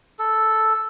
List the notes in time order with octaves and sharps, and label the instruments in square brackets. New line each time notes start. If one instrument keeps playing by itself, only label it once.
[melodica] A4